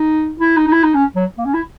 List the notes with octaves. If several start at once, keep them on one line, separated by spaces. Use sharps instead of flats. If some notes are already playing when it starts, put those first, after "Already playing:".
Already playing: D#4
E4
D#4
D#4
E4
D#4
C#4
F#3
A#3
C#4
E4